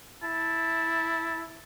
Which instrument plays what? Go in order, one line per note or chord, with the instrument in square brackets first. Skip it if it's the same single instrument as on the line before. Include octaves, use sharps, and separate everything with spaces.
[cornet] E4 [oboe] A5